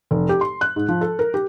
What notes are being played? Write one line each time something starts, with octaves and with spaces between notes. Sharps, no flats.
F1
G4
C6
F#6
G#2
F3
A4
A#4
G4